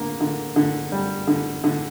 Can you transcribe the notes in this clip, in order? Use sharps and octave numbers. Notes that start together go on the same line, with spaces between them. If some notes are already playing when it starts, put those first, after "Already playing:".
Already playing: D3 A#3
D3
D3
G3
D3
D3